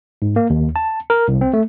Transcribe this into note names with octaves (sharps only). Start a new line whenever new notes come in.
G#2
A#3
D#2
A5
A#4
C2
C4
A3